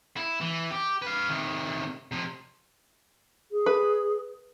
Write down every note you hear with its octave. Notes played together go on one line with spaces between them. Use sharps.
E4
E3
G4
B4 F5
C3 D#3
C3 F3
G#4
B4